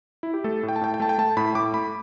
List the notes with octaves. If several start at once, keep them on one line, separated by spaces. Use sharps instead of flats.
E4
G4
A3 A4
A2
G5
A5
A2 G5
G5
A3 A5
G5
A3 A5
A2 B5
A2 D6
A3 B5